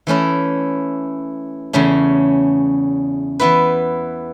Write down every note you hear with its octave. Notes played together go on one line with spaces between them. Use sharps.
E3 A3 C#4 E4
E2 C#3 A3 C#4
E3 B3 E4 B4